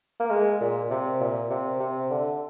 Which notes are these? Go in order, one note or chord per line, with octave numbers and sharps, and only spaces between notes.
A#3
G#3
A#2
C3
A#2
C3
C3
D3